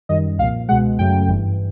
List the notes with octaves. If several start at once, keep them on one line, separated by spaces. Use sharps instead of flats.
F#2 D#3 G3 D#5
C2 A#2 F3 F5
C#2 B2 G#3 F#5
F#2 C#3 F#3 A3 G5
G1 G2 E3